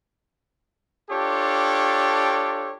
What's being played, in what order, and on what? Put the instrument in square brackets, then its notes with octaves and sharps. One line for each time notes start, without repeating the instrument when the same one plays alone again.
[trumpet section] D4 F4 G4 A4 C#5